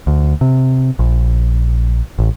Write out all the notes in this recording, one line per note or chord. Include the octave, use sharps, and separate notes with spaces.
D2
C3
A#1
A1